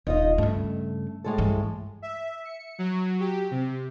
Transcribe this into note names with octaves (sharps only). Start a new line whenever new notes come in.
D#1 D#4 F4 D#5
G2 C#3 A3
A2 G#3 A4
G2 E3
E5
C#7
F#3
G4
C3